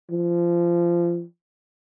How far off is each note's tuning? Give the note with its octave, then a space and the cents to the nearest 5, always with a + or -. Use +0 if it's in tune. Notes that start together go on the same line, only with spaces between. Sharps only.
F3 -25